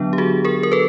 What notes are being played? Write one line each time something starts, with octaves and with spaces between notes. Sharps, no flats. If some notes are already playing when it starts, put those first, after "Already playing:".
Already playing: D3 F#3 B3 D4
G4
F#4 G#4
G#4 A#4
A#4
A4 B4